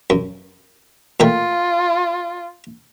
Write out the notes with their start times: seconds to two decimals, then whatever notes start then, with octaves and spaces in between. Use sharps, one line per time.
0.10 F#2
1.20 A#2 A3 F4 G5